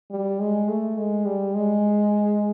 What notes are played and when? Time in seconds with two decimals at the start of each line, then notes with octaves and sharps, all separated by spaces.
0.11 G3
0.40 G#3
0.68 A3
0.97 G#3
1.25 G3
1.54 G#3